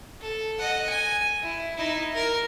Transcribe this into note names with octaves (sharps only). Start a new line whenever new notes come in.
A4
D#5 F#5
G#5
E4
D#4 E4
A#4